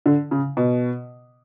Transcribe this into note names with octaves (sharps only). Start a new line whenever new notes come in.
D3
C#3
B2